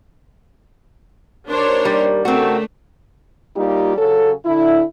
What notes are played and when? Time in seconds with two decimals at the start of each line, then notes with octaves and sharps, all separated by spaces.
1.48 D#2 D4 A#4 C5 C#5
1.85 G3
2.25 C#3 A3 C4 D4 F#4 A#4
3.56 G3 A#3 D#4 F4 G4
3.97 C#3 F#3 C#4 A4
4.46 D3 E4